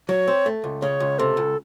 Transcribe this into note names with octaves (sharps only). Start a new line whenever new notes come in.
F#3 C#5
C4
A3
C#2
C#3 C#5
C#2
C3 A4
C#2